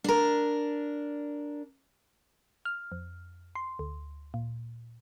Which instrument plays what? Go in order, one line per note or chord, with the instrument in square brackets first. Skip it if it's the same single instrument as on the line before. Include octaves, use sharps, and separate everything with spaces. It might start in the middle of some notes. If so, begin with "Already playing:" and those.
[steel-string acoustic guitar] D4 A#4
[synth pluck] F6
F2
C6
D2
A#2